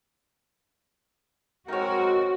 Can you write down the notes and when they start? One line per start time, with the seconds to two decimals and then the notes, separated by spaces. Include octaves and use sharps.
1.68 G#3 C4 D#4 F#4 A#4 C#5